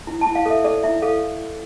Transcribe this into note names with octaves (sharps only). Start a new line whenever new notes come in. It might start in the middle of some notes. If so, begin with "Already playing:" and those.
E4
A5
E4
F5
A4 E5
A4 D5
E4 E5
A4 F5